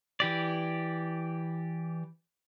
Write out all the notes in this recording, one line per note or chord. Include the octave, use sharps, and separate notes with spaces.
E3 G4 D5